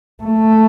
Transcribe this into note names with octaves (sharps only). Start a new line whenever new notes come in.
A3